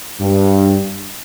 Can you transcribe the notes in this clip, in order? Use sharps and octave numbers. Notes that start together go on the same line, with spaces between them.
G2